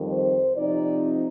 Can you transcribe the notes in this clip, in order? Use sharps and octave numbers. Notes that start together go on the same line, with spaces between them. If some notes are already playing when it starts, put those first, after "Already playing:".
Already playing: F2 D#3 G3
C5
C3 F3 C4 D#4 D5